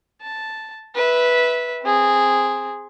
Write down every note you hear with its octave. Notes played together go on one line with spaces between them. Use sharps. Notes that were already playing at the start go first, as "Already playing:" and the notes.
A5
B4 E5
C4 G#4